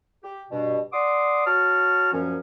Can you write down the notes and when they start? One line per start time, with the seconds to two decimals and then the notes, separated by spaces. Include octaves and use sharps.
0.23 G4
0.51 G2 B2
0.93 D5 F#5 C6 D6 D#6
1.46 F#4 C#5 A5 F6
2.13 F#2 A#2 F3 C#4